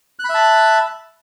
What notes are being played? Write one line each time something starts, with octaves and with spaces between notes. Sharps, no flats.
E5 A5 B5 F#6